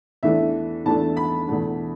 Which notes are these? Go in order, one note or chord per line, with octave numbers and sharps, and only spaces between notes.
E2 E3 A3 D4 E5
E2 E3 A3 D4 A5
B5
E2 B2 A3